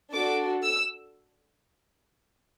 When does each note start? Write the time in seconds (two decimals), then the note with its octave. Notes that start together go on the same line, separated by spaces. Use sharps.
0.12 D4 F#4 A4 D6
0.63 E6